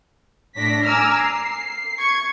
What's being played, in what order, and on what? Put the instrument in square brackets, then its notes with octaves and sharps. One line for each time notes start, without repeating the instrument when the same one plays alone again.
[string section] A2 D4 A#6 B6
G#5 A#5 D6 E6 F6
C7
C#6 G#6